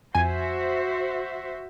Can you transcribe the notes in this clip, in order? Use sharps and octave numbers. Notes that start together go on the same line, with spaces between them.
F2 F#4 C5 E5 G#5